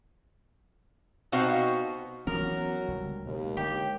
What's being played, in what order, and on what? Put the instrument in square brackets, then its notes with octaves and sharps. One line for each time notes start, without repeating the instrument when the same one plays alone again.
[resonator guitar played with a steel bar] B2 C4 D#4 F#4 C5 F5
[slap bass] E3 B3 C#4 [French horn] F#3 [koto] A#4
[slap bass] C#2 D3 G3
[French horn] D#2 [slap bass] B2 G#3
[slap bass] D3 G#3 [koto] G4